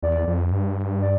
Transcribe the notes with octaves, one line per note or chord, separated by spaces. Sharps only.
E2 D5
F2
G2
D5